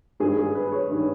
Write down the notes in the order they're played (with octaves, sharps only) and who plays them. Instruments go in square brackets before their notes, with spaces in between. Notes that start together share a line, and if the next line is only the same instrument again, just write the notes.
[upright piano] G2 D#3 G#4
G#4
B4
C#5
G2 D#3